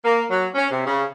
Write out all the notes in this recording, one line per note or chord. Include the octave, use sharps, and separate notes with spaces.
A#3
F#3
C#4
C3
C#3